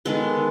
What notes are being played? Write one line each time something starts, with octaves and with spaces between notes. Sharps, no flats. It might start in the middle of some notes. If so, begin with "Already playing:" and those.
D#3 G#3 B3 A4